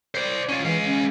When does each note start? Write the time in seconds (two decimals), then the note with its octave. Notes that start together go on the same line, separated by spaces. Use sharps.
0.15 C5 D5
0.49 C#4 F4
0.65 E3 G#3 F5
0.85 C#4